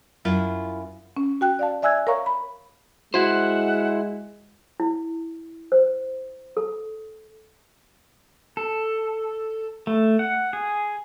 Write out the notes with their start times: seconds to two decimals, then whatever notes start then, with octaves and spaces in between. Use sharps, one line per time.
0.25 F#2 E4 F4
1.17 C#4
1.41 F#4 G5 F#6
1.59 D5 F5 A5
1.82 D5 E5 G#5 E6 F#6 G#6
2.07 A#4 C#5 F5 A#5 C#6
2.26 B5
3.14 G#3 E4 F#4 C5 F#5
4.80 E4
5.72 C5
6.57 A4
8.57 A4
9.87 A3
10.19 F#5
10.53 G#4